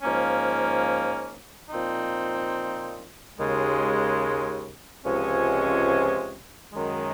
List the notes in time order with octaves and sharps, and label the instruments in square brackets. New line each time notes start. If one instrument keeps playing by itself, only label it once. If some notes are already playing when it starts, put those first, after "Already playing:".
[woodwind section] G#2 F3 A#3 C#4
A#2 F3 C4 D#4
D#2 C#3 G#3
C#2 C3 F3 G#3 C#4
F#2 D#3 G#3